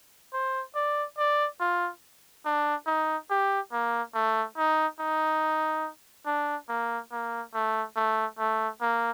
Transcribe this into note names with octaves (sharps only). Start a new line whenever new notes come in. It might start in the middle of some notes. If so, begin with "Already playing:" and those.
C5
D5
D5
F4
D4
D#4
G4
A#3
A3
D#4
D#4
D4
A#3
A#3
A3
A3
A3
A#3